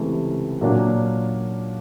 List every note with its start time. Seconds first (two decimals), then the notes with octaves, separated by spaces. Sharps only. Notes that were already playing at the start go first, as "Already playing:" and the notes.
Already playing: C#2 C3 E3 A3
0.61 A#2 F#3 A#3 D4 F4